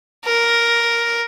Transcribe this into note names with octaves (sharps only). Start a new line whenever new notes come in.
A#4